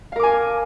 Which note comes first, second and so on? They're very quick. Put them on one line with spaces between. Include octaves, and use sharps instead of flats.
F5 A#4 D6 G#5